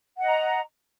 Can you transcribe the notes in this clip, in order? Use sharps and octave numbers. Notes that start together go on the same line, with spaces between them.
D#5 F#5 A#5